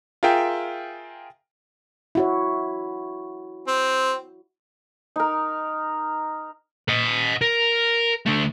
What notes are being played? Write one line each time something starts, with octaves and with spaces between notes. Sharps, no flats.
F4 G#4 A#4 E5 G5 G#5
E4 F#4 C#5
C4
D#4 A#4
D#5 F#5
A#4
D3 A3